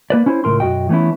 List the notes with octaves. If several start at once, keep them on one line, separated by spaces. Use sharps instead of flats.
A#3 B4 D5
C#4 E4 C5
C#2 A2 C#3 A#4 C6
B1 F#2 F#4 D#5 G5
E3 A3 B3 C#4 E4